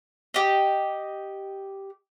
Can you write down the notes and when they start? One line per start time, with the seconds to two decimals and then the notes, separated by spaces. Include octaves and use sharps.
0.34 G4 D#5